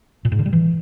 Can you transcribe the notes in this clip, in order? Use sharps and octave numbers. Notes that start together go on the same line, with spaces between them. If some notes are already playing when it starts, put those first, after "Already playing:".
A#2
G#2
D3
G3
E3